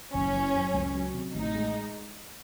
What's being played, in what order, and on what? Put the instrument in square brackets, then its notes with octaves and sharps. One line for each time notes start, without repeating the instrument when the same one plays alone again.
[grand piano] F#1 [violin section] C#4
[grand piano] E3
F#2
C#2
F#3
C3
[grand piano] A1 [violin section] D#4
[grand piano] G#3